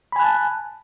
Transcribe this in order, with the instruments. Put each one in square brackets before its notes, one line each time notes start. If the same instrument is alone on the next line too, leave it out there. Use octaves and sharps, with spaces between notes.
[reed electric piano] B5
G#5
F#6
A5